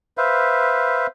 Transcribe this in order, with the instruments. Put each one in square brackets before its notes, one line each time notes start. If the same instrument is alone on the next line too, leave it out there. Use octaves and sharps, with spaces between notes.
[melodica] B4 C5 E5 F5